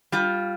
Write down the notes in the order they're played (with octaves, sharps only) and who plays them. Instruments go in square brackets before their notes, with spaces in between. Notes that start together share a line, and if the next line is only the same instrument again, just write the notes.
[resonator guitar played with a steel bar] G3 F4